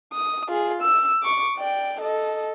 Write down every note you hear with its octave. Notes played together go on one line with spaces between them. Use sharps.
D#6
F4 G#4
E6
C#6 D6
D5 G5
A4 D#5